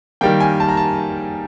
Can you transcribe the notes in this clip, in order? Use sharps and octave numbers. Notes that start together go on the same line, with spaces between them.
D#3 G3 A#3 G5
G#5
A5
A#5
A5